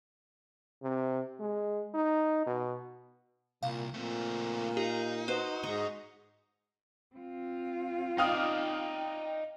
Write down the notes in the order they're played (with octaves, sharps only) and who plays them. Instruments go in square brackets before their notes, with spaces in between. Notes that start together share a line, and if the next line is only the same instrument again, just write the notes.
[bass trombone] C3
G#3
D#4
B2
[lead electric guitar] C2 [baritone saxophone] A#2 [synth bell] F5
[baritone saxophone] A#2 [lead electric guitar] A3 C4
[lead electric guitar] D#4 [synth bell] G4
[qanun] F#4 C5 D#5 [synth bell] B4
[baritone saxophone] G#2 [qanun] D#5 C#6
[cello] C4 F4
[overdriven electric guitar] D#4 D5 [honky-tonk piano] F5 D#6 F6 [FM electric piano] G5